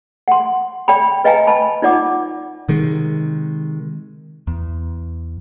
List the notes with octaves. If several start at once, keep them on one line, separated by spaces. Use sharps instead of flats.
F#5 C6
D5 G5 B5
B4 D#5 F5 G5 G#5 A#5
D#5 A5 B5
D#4 F4 D5 F#5 D6
C3 D#3 G#3
E2